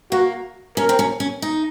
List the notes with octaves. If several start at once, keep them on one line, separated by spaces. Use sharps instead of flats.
A#3 F#4
C#4 A#4
C4
C#4
C#4
D#4